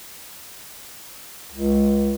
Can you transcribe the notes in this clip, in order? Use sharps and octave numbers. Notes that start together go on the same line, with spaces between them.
C#2